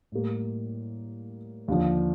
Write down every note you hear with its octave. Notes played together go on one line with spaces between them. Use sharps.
A2 G3 A#3
D#2 D3 F3